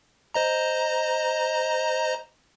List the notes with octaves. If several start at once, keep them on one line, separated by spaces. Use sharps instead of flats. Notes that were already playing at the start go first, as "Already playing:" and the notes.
C5 D#5 A#5